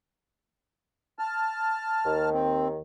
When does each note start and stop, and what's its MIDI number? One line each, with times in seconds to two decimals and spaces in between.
1.19 2.29 81
1.19 2.29 89
2.05 2.80 39
2.05 2.80 51
2.33 2.68 60